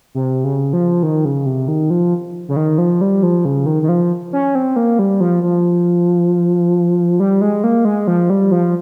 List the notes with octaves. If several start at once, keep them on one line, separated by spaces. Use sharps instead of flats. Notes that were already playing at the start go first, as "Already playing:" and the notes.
C3
C#3
F3
D#3
C#3
C3
D#3
F3
C#3
D#3
F3
G3
F3
C#3
D#3
D#3
F3
C#4
C4
A#3
G3
F3
F3
G3
G#3
A#3
G#3
F3
G3
F3